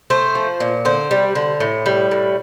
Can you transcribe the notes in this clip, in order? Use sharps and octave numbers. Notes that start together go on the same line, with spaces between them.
A3 C5
F3
A#2
D3 C5
G3
D3
A2
G3
A2